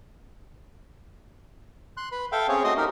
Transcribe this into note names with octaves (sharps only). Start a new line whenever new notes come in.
C6 F#6
B4 B5
A4 E5 F5 G5
C4 C#4 G#4 C#5
A3 F#4 D#5 C6 D#6
D#4 G4 A#4